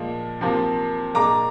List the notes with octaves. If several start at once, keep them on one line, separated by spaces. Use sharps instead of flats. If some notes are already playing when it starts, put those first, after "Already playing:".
Already playing: A#2 F3 G#3
C3 F3 A#3
A#2 G#3 A#5 D6